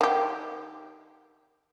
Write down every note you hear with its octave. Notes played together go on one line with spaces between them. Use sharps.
D#3 G4